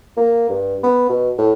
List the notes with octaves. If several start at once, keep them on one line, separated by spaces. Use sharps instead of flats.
A#3
G2
B3
B2
A2